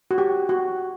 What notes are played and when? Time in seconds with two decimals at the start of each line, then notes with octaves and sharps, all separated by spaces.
0.11 F#4
0.18 G4
0.49 F#4